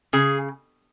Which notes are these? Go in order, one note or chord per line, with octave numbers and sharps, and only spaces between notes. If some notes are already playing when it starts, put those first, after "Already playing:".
C#3 G#4